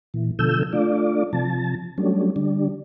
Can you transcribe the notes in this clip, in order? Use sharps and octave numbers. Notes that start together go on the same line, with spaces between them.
A#2 E3
B2 D3 F3 A4 E6 G6
A3 D4 F4 D5
C3 F3 A5
F#3 G3 A3 C#4 D4
D3 G3 D4